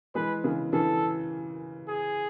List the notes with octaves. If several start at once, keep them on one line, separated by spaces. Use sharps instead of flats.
E3 G#3 B4
C#3 E3
C#3 E3 A4
G#4